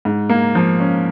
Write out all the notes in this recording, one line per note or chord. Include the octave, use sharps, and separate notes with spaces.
G#2
A#3
F3
C#4